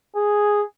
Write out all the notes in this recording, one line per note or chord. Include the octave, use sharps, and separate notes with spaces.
G#4